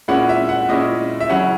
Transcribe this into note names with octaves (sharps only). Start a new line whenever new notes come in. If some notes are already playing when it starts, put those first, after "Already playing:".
A#2 G#3 C#4 E4 F#5
E5
F#5
A#2 G#3 C#4 E4 D#5
E5
C#3 F#3 C#4 E4 F#5